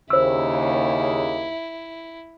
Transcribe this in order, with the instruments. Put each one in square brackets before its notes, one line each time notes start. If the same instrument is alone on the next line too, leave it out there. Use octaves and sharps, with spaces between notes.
[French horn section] D#2 C#3 [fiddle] E4 [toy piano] C5 E6